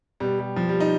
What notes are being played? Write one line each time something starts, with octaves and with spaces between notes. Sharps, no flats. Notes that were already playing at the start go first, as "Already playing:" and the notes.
B2 G3
G3
F3
G3
D#4